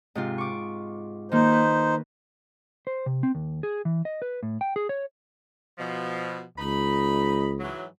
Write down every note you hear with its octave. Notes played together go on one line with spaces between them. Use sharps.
G#2 C3 F4
C#6 D6
D#3 A#3 D#4 C5
B4
C5
C3
C4
D#2
G#4
E3
D#5
B4
A2
G5
G#4
C#5
B2 F3
C#2 D#4 D#5 B5
G#2 E3 F#3